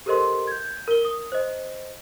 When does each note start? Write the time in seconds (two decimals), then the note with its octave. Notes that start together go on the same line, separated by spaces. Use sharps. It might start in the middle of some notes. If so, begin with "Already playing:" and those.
0.06 G4 A4 A#4 C5 D#5 C6
0.47 G6 G#6
0.88 A#4 G7
1.05 D#6
1.32 C5 D#5